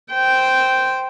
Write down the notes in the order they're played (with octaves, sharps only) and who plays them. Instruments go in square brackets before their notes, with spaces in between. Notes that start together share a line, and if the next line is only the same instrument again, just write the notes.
[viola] C5 G5